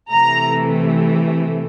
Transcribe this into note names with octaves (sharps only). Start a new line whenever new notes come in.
C3 E3 A3 A#5